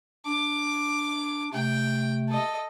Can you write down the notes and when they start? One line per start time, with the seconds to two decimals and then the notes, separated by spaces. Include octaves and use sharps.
0.25 D4 D6
1.53 C3 A3 G5
2.28 A4 D#5